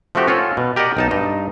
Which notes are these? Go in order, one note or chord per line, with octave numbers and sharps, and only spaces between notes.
F3 A3 C4 F#4 G4
C#4 F4 F#4 A4
B2
G4 A#4 D5 D#5 F#5
B1 D#4 A5
G2 D#4 D#5